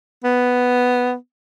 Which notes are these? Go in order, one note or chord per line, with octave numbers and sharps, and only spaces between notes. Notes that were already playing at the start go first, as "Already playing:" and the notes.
B3